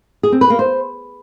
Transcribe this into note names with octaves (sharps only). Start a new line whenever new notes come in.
G#4
C4
B4
A#3
C5